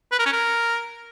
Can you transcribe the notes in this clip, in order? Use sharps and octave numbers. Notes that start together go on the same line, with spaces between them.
B4
A#4
C#4
A#4